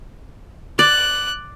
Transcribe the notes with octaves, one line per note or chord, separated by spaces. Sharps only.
D5 F#6